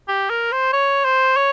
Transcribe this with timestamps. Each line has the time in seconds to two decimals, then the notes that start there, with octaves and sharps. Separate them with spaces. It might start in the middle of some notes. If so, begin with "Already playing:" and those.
0.09 G4
0.30 A#4
0.52 C5
0.73 C#5
1.05 C5
1.37 C#5